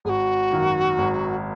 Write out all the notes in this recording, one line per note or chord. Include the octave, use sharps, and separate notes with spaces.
G#1 F#4 G#4
F#2 D#3 A#3
G#1